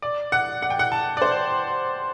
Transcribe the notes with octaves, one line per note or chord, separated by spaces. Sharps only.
D5
F#5
F#5
G5
F#5
A5
D5
C5